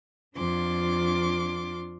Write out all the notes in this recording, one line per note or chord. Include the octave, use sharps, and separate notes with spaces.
F2 D4 F4 C6 D6